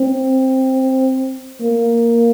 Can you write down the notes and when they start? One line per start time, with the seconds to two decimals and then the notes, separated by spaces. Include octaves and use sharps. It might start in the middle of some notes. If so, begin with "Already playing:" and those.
Already playing: C4
1.62 A#3